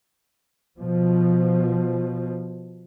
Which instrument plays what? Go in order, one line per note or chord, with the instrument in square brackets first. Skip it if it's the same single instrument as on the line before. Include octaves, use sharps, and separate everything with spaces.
[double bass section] B2 F3